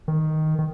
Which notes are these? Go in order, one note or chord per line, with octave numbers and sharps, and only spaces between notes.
D#3
D#3